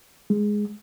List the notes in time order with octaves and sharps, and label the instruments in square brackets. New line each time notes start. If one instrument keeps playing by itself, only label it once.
[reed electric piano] G#3